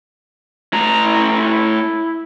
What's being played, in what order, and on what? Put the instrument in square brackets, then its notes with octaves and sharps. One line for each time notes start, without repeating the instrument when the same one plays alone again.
[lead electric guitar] A2 A#5
[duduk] E4
E4
E4